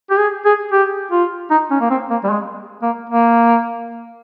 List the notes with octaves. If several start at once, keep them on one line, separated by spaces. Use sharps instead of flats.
G4
G#4
G#4
G4
F4
D#4
C#4
A#3
C4
A#3
G3
G#3
A#3
A#3